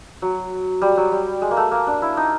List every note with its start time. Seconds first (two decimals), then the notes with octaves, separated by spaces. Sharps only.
0.22 F#3
0.82 G3
0.97 F#3
1.12 G3
1.42 G#3
1.51 A#3
1.57 A3
1.71 A#3
1.87 D4
2.02 E4
2.17 D#4